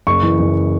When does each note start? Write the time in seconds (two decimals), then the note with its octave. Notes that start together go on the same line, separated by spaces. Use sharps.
0.07 F#1 C#6
0.23 E3
0.40 F#1